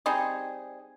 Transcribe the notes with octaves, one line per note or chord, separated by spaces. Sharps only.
G3 C4 D#4 G#4